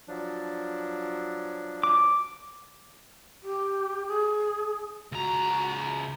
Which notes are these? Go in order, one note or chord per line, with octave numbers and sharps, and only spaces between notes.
F3 F#3 D4
D6
G4
G#4
C#2 F#4 A#5